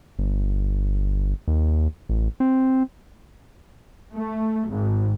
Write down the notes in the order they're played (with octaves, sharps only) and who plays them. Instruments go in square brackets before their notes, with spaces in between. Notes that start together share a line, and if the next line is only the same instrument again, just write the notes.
[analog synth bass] G1
D#2
A1
C4
[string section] A3
G#1